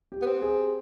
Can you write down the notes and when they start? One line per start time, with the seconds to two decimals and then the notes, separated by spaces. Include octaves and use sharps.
0.12 G4
0.22 B3
0.26 C4
0.42 G#4